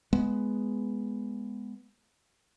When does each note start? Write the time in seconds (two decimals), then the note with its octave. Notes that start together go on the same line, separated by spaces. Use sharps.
0.13 G#3 B3